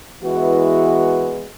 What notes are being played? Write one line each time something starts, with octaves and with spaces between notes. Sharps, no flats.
E3 G#3 B3 E4 F#4